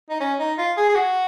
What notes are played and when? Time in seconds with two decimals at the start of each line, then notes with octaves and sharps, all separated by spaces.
0.10 D#4
0.20 C#4
0.39 D#4
0.58 F4
0.77 G#4
0.89 G#4
0.96 F#4